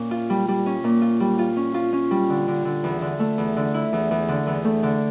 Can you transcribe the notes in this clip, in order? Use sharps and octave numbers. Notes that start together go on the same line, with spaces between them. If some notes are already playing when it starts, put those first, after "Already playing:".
Already playing: A#2 C#4
F4
G3
G3
C#4
A#2
F4
G3
F4
C#4
F4
C#4
G3
D3
D3
D3
E2
D3
A3
E2
D3
E4
E2
E2
D3
E2
A3
D3